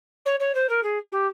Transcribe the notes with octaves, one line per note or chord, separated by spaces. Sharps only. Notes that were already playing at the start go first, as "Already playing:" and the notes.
C#5
C#5
C5
A#4
G#4
G4